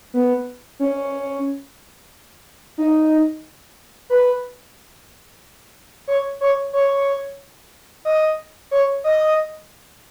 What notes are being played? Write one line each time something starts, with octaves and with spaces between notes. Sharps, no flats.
B3
C#4
D#4
B4
C#5
C#5
C#5
D#5
C#5
D#5